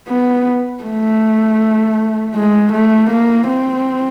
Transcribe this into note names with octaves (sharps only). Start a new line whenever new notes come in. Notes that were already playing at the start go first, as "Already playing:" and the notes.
B3
A3
G#3
A3
A#3
C4